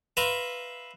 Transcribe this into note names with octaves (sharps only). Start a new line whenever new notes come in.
B4 E5 F5 A#5 C6